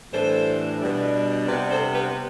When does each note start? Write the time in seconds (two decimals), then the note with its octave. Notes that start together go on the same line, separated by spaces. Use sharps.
0.13 A2 E3 G3 D4 A4 C5
0.81 B2 G3 D4
1.48 C3 G3 B3 D4 B4 D5
1.71 A4 C5
1.94 G4 B4